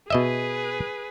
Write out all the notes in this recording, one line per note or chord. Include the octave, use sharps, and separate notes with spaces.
B2 G#4 B4 D#5 E5